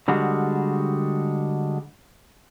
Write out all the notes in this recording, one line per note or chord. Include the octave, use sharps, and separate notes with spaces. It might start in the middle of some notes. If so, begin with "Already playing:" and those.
D3 G3 G#3 F#4